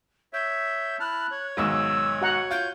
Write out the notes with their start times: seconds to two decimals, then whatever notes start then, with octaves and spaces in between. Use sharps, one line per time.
0.33 C#5 E5 G6
1.00 E4 A5 F6 F#6
1.31 C#5
1.57 B1 G#2 D#3 E6
2.22 F#4 F#5 A#5
2.51 F4 G6